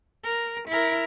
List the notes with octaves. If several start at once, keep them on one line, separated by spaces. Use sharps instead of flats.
A#4
E4 A#4